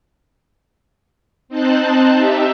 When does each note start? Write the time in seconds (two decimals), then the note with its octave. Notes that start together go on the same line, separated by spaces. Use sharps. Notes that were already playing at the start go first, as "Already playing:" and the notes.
1.48 C4 D#4 C5 A5 F#6
2.13 D#4 G4 E5